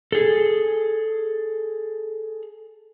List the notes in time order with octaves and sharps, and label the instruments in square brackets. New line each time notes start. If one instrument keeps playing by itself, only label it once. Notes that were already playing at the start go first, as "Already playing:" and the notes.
[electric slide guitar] G#4 A4